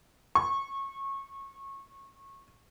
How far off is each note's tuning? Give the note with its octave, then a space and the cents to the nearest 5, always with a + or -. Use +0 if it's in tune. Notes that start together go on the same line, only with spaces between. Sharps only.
C#6 -25